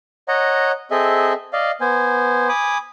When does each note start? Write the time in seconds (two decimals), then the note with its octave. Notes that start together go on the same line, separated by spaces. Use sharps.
0.28 C#5 D#5 F#5 A#5
0.91 C4 G#4 A4 D#5 E5
1.53 D5 D#5 F5
1.81 B3 C5 G#5
2.49 G#5 B5 D6 D#6